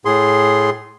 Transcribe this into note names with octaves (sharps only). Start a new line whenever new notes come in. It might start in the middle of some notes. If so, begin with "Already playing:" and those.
A2 G#4 C6